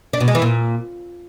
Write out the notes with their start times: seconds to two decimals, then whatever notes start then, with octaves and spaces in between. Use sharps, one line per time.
0.13 D4
0.21 B2
0.28 G#3
0.35 E3
0.42 A#2